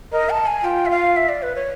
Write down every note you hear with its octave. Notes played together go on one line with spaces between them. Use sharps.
A#4 D#5
A5
G#5
F4 G5
E5
F5
E5
D5
B4
C#5